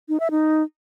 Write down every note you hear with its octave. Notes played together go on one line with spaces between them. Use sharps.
D#4
E5
D#4